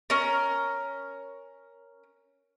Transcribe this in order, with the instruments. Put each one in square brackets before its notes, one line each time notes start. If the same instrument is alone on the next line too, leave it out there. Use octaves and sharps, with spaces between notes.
[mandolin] C#4 A#4